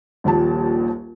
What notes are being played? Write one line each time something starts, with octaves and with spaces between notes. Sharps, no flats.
D#1 A#1 D#2 G4 A5